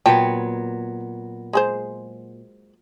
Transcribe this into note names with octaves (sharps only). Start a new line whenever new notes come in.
A#2 F#3 B3 G5 A5
G#3 G#4 C5